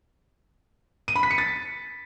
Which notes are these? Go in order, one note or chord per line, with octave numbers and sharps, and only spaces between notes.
D#7
B5
B6
C#7
A6